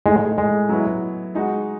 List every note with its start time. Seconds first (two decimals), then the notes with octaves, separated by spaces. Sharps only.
0.06 A2 E3 G#3 A3 D#4 G#4
0.38 G#3
0.69 F#3 B3 E4
1.35 G#3 D#4 F#4